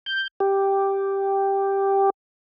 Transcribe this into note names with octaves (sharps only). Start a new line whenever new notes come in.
G6
G4